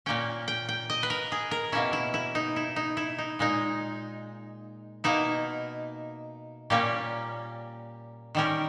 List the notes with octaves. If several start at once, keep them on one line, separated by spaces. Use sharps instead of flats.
A#2 A#3 C#4 G5
G5
G5
D#5
B4
A#4
G#4
A#4
B2 A#3 C#4 E4
E4
E4
D#4
E4
D#4
E4
D#4
A#2 G#3 D#4
B2 A#3 D#4 E4
A#2 G3 A#3 C#4 G4
D#3 G3 C#4 A#4